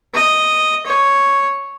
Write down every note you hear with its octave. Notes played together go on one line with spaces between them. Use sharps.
D#5
C#5